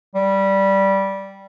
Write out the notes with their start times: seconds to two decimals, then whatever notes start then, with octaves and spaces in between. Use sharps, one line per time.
0.15 G3